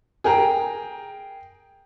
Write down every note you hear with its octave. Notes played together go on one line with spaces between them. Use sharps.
G#4 A#4 G5 A#5